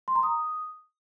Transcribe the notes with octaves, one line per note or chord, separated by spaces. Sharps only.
C6
A#5
D#6